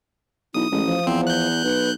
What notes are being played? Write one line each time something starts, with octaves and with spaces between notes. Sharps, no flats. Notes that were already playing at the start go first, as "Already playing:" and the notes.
B1 E4 D#6
A1 G#3
F3
E2 C4
F#6 G6
B1 B4